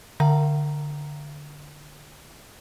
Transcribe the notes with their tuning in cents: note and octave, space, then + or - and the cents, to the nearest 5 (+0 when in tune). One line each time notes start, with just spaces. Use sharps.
D3 +0 F5 -45 A#5 +0